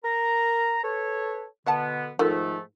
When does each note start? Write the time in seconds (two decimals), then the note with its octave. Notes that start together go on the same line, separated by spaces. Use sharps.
0.05 A#4 A#5
0.83 A4 B4 C#5
1.66 B2 D3 B3 E5 F#5 A5
2.19 G#2 D#3 F3 A3 F4 A4